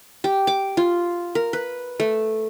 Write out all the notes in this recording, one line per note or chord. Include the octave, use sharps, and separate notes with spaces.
G4
D6
F4
A#4
B4
A3